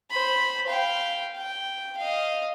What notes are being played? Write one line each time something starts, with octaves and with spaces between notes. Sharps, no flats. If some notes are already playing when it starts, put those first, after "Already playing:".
C5 B5
F5 G5
G5
D#5 F5